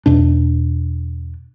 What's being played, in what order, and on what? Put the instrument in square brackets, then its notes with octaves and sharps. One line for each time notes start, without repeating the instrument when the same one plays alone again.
[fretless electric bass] E2 B2 D4